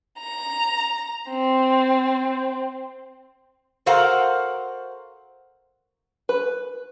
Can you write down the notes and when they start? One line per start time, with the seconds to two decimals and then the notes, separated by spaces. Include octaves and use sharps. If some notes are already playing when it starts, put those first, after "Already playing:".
0.19 A#5
1.30 C4
3.86 F#4 A4 A#4 C5 F5 F#5
6.29 B4